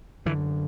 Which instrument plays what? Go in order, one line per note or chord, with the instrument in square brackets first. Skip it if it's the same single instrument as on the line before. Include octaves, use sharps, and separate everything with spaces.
[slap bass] F#2 D3 E3